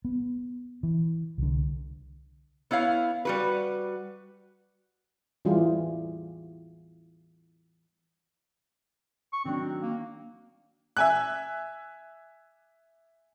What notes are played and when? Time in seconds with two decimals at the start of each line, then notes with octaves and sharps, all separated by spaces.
0.05 B3
0.83 E3
1.38 C2 D3
2.71 B3 E4 C#5 F5
3.25 G3 F#4 B4
5.45 E3 G3 E4 F4 G4 G#4
9.33 C#6
9.45 D#3 F#3 C4 D4
9.82 A#3
10.97 E5 G#5 F#6